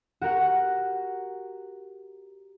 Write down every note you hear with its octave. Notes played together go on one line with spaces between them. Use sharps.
F#4 G4 A#4 F#5